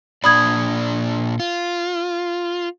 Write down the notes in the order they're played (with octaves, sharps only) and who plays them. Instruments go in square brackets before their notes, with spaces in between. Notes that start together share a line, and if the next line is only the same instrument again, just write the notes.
[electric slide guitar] A#2 D4 D5 [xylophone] B5 D#6 G#6
[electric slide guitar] F4